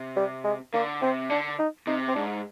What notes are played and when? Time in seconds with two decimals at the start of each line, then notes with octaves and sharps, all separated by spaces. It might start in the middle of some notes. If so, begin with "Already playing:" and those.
Already playing: C3
0.16 G3
0.44 G#3
0.74 D3 A#3
1.02 C3 C4
1.30 D3 D4
1.59 D#4
1.87 C3 D#4
2.08 C4
2.15 G#2 D4